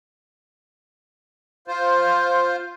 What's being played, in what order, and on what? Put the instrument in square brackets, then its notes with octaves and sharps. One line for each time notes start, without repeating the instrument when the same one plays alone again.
[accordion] F4 C5